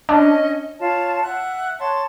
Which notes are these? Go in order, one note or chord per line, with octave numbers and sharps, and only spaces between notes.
C#4 D4 D#5
F4 C#5 A5
E5 F#5 F#6
C#5 A5 C6